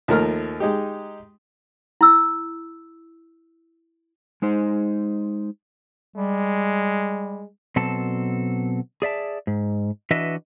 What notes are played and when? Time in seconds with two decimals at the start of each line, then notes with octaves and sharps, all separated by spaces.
0.08 D#2 F3 A3 A#4 A#5 F6
0.60 G#3 D#4 G4
2.01 E4 E6
4.42 G#3 D#4 C5
6.16 G3 G#3
7.76 B2 F#3 C4 A4 A5
9.02 G#4 D5 E5 A5
9.47 G#2
10.11 E3 D4 F#4 B4 D#5 E5